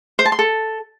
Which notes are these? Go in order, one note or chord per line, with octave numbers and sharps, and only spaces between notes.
C5
A5
C6
A4